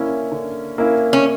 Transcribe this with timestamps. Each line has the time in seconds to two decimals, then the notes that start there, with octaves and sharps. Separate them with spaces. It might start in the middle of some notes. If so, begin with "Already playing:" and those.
Already playing: D3 A#3 C#4 E4
0.32 D3
0.78 A#3 C#4 E4
1.13 C#4